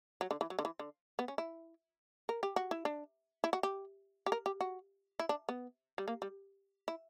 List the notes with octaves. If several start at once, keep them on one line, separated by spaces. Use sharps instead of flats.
F#3
D3
E3
F#3
D3
E3
D3
B3
C#4
E4
A#4
G4
F#4
E4
D4
E4
F#4
G4
G4
A#4
G4
F#4
E4
D4
B3
G3
A#3
G3
E4